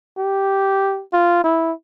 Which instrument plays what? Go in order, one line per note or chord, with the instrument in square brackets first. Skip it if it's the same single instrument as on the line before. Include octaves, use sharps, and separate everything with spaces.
[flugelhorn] G4
F4
E4